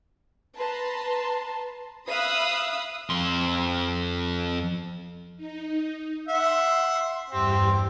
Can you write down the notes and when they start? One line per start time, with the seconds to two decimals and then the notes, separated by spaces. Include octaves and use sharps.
0.58 B4 A5 A#5 C6
2.10 E5 F5 B5 D#6 E6 F#6
3.10 F2 C6
5.36 D#4
6.28 E5 F#5 C6
7.31 E2 G2 C4 G4